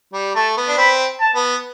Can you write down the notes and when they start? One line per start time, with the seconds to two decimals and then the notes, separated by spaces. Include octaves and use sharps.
0.13 G3
0.35 A3 A5
0.57 B3
0.68 D4
0.77 C4 B5
1.21 A5
1.35 B3